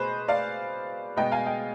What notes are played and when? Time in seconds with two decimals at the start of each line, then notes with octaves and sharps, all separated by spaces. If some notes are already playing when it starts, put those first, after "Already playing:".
Already playing: B2 G#4 B4 C5 D#5
0.28 D5 F5
1.16 B2 G#3 B3 D#5 G5
1.32 F5 G#5
1.46 D#5 G5